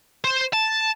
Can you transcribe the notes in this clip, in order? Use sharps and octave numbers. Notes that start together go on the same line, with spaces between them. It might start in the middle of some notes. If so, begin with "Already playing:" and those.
C5
A5